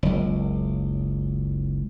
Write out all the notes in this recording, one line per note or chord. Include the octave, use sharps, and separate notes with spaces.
F#1 C#2